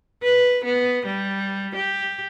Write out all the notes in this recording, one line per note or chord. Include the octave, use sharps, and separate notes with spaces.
B4
B3
G3
G4